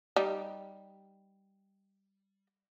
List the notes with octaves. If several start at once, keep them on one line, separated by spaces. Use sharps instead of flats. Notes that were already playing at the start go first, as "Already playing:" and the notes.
G3 D#4